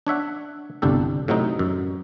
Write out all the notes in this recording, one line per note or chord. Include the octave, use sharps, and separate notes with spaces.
D4 C#5 E5 F#5
G1 C2 D4 G4 A4
A2 C3 F#3 C4 D#4
F#2